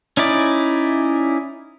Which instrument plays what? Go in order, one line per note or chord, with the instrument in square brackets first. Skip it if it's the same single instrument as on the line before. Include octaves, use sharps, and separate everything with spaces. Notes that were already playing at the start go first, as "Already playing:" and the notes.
[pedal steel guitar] C#4 D#4 E4 D5